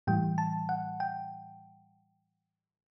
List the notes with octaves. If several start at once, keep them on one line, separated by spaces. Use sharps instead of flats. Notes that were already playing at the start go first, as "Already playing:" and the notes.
A2 E3 G3 G5
A5
F#5
G5